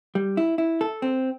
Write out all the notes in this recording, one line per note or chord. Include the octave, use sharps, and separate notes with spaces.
G3
E4
E4
A4
C4